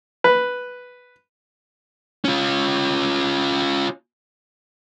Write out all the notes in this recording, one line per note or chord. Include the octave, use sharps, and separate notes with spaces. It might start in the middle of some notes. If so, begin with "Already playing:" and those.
B4
C#4 F4